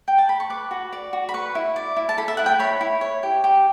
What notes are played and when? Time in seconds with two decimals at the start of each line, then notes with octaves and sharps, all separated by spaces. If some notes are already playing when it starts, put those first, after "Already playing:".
0.08 G5
0.18 A5
0.29 B5
0.40 C#6
0.50 B4 D6
0.71 F#4
0.93 D5
1.13 F#4
1.29 B5
1.34 B4 C#6
1.55 E4
1.76 D5
1.97 E4
2.09 A5
2.18 A4 B5
2.28 E5
2.37 E4 F#5
2.46 G5
2.59 C#5 B5
2.81 E4
3.01 C#5
3.23 G4
3.44 G4